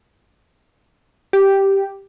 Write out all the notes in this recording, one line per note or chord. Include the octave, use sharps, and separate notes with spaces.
G4